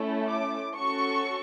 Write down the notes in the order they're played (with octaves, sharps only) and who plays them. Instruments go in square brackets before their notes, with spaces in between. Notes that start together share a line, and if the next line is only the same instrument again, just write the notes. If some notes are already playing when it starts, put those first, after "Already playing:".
Already playing: [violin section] A3 C#4 E4 A4
D6
C#4 F#4 A4 C#6